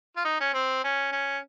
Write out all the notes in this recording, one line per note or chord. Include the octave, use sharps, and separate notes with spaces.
F4
D#4
C#4
C4
C#4
C#4